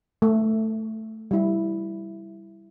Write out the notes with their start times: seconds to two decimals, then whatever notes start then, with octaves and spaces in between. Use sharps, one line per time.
0.22 A3
1.31 G3 E4